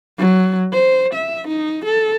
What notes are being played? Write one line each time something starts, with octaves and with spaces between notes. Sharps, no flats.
F#3
C5
E5
D#4
A4